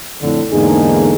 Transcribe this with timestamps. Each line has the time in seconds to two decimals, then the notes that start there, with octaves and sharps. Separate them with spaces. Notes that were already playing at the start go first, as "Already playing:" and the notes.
0.22 F2 A2 D3
0.52 E2 G#2 D3 A#3 D#4 G#4